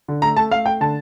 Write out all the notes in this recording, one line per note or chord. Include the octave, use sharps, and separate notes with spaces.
D3
A3 A#5
A3 A5
A3 F5
A3 G5
D3 A5